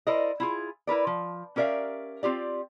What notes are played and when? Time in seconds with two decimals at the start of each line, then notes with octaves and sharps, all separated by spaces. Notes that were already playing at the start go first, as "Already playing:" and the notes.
0.07 E4 A#4 C5 D5 D#5
0.40 E4 F4 G#4
0.87 E4 A#4 B4 D5
1.07 F3
1.56 C#4 G4 A#4 D5 E5 F5
2.23 C4 F4 G4 D5